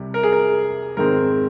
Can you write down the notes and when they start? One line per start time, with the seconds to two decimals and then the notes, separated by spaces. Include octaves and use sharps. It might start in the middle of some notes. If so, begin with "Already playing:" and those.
Already playing: C2 C3 G3
0.14 A#4
0.23 G#4
0.33 A#4
0.97 G#2 D#3 G#3 C4 A#4